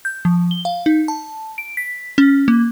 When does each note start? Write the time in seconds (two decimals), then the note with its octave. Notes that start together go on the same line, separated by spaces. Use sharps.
0.05 G6
0.25 F3
0.51 G7
0.65 F5
0.86 D#4
1.08 A5
1.58 D7
1.77 B6
2.18 C#4
2.48 A#3